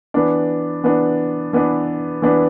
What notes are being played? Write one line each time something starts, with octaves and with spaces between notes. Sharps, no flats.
E3 B3 D4
E3 B3 D4
E3 B3 D4
E3 B3 D4